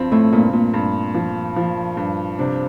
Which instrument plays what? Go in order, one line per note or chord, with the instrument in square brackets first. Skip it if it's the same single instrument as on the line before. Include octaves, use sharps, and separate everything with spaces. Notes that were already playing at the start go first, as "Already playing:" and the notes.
Already playing: [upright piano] G2 F3 C4
[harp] A2
[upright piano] G2 [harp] A#2
[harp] A#2
[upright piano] G2
F3
F3
G2
[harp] C3 [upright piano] D4